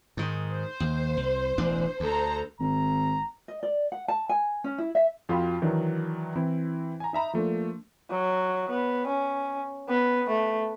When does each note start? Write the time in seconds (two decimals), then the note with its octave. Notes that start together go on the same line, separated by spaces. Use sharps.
0.17 G#2 D#3
0.52 C5
0.80 D#2
1.17 C2
1.58 E1 A1 D4
2.00 D2 A4 C5 A#5
2.60 G#1 A#5
3.48 D#5
3.63 D5
3.92 F#5
4.08 A5
4.29 G#5
4.64 C#4
4.78 E4
4.95 E5
5.29 F2 F4 F#4 F5 G5 B5
5.62 D#3 E3 F#3 D4
6.36 E3 C4 E4
7.00 G#5 A#5
7.13 D#4 E5 A#5 B5
7.33 F3 A3 A#3 D4
8.10 F#3
8.70 B3
9.08 C#4
9.89 B3
10.29 A3